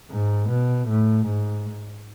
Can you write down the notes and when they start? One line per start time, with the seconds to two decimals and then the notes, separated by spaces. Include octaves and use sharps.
0.11 G#2
0.49 B2
0.88 A2
1.26 G#2